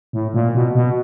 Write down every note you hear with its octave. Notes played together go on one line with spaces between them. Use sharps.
A2
A#2
B2
B2